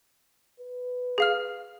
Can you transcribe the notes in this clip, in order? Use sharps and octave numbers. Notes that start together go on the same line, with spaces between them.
B4
G#4 F5 F6